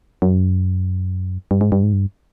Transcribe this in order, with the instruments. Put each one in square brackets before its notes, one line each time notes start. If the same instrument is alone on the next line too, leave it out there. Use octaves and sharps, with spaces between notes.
[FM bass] F#2
G2
G#2
G2
G#2
G2